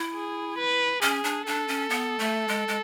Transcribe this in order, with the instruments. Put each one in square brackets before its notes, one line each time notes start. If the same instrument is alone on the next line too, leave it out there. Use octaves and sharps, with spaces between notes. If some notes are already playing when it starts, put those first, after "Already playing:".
Already playing: [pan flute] E4
[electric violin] G#4
B4
[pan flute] C#4 [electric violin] G#4
[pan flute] D4
[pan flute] D4 [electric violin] A4
[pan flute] C#4
B3
A3
G#3
G#3